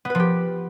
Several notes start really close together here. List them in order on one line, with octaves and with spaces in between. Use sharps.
B3 B4 F3 G4